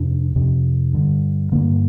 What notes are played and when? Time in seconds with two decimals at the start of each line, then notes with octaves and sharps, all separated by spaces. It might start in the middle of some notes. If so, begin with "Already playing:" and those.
Already playing: F2 C3 D4
0.36 F2 C3
0.93 G2 D3
1.52 G2 D3 A#3